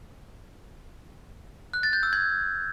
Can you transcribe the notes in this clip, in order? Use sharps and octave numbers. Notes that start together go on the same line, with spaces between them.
F#6
A6
G6
E6
G#6